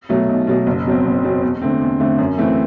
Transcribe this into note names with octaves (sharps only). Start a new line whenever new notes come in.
B2 F#3 A3
B1
B2 F#3 A3
F#1
E2 B2 F#3 C4
F#1
E2 B2 F#3 C4
E2
D3 A3 C4
E2
D3 A3 C4
F#2
E3 A3 C4